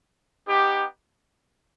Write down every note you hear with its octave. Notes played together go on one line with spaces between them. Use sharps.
B3 D#4 G4